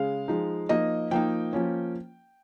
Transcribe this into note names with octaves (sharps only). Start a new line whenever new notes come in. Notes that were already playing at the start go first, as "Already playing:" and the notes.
Already playing: C#3 G#3 F5
F3 G#3 D#4
F3 A#3 D#4 D#5
F3 A#3 D#4 G5
F3 A#3 C#4